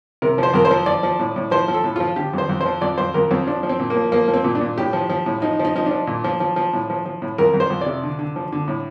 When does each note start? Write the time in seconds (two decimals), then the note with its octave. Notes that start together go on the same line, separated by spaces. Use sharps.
0.22 C3 A#4
0.38 F3 C5
0.54 F2 A#4
0.65 C5
0.71 F3
0.86 F3 D5
1.03 F3
1.19 A2
1.36 A2
1.51 F3 C5
1.68 F3
1.74 A4
1.84 A2
1.96 F3 F4
2.16 D3 G4
2.33 F2 C5
2.49 F2
2.61 F3 C5
2.81 F2 D5
2.98 F2 C5
3.14 F2 A#4
3.31 F2 C4
3.47 F3 D4
3.63 F3
3.69 C4
3.79 A#2
3.90 A#3
3.97 F3
4.12 F3 A#3
4.28 F3
4.34 C4
4.44 A#2
4.55 D4
4.61 A#2
4.78 A2 G4
4.93 F3
5.09 F3
5.26 A2
5.42 F3 D#4
5.59 F3
5.65 D#4
5.76 F3 D#4
5.86 D4
5.91 F3
6.07 A#2
6.24 F3
6.40 F3
6.56 F3
6.73 A2
6.90 F3
7.05 F3
7.22 A2
7.38 F2 A#4
7.54 F2
7.60 C5
7.70 F2
7.81 C3 D5
8.03 D3
8.19 D3
8.36 F3
8.52 D3
8.68 A2